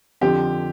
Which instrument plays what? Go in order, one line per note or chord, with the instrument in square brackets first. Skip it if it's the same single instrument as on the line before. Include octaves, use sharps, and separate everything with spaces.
[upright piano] F2 D3 F3 G4